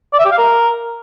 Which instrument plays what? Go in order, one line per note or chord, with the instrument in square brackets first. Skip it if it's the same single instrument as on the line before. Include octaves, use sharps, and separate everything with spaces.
[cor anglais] D5
E5
G4
F5
A#4